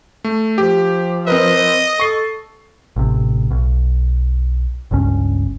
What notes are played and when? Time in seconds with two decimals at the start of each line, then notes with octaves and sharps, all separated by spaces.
0.24 A3
0.58 F3 G4
1.27 C4 A#4 B4 D#5
2.00 A4 C#6 C7
2.96 A1 C3
3.50 B1
4.91 G1 C#2 G2 C#4